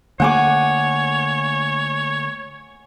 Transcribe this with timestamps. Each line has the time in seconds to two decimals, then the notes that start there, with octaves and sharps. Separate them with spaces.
0.20 D3 A3 A#3 C#5 F#5 G#5 D6